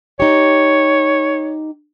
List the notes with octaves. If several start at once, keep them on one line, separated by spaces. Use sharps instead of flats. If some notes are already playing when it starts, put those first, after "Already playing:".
D#4 G4 C#5